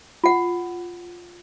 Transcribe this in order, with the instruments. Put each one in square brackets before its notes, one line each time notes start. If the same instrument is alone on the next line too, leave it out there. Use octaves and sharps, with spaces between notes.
[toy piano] F4 F#5